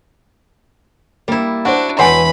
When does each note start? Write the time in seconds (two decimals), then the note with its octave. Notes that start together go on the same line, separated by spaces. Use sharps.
1.28 G3 A#3 E4
1.65 D4 F#4 C5 F#5
1.99 E1 E3 C#5 F#5 G#5 B5 C6